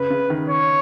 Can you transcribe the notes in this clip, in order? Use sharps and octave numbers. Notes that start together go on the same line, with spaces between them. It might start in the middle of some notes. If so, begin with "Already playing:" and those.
Already playing: C#3 B4
C#3
D#3
C#5